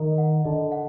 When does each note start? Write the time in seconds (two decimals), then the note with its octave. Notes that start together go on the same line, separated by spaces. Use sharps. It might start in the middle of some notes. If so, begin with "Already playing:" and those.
Already playing: D#3 A#4 D#5
0.18 F#5
0.44 D3 D#5
0.72 F#5